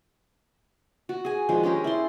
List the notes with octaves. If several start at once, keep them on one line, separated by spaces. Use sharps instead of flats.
F#4
G#4 G#5
D#3 F3 G#3 D4
C#4 G4 G#4 A#4
E4 D5 C6